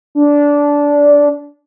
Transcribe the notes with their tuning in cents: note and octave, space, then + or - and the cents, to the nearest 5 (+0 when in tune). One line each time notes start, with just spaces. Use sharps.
D4 -15